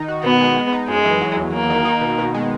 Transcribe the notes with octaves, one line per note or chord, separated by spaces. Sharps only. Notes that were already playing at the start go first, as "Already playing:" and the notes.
Already playing: D#3 D#4
F#4
B2 B3
G#3
G#3
D#4
F#2 G#3
E3
F#3
E2
E2 A#3
D#3
D#4
B2
B2
G#3